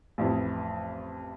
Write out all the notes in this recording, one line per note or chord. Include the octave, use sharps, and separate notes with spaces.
A1 F2 E3